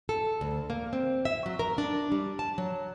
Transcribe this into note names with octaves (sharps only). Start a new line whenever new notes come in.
A4
D2
A#3
C4
E5
F#3
A#4
D4
G3
A5
F#3